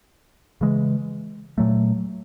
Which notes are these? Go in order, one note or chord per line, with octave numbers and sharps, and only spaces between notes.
C#3 E3 G#3
A#2 F#3 A3